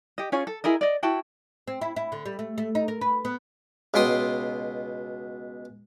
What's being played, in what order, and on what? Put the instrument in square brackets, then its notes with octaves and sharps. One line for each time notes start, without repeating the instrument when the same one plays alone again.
[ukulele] G4 D#5
C#4 F4 G#4 C#5
A4
E4 G#4 A#4 D#5
D5 D#5
E4 F#4 G5 A5
[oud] C4
E4
E4
D3
G3
A3
A3
D#4
A#4
B4
B3
[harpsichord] C#2 B2 G5 C6 D#6